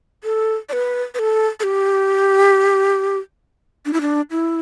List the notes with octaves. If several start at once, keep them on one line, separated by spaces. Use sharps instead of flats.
A4
D5
B4
B4
A4
A4
G4
D4
E4
D4
E4